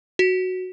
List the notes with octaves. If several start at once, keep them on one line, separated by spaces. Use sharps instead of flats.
F#4